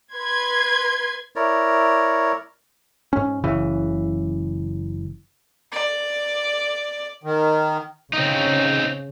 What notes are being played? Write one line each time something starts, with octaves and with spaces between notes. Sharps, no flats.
B4 C6 G#6
E4 A#4 C#5 D5
G#2 C#4
F#1 C#3 E3
D5
D#3
C#3 C4 D#4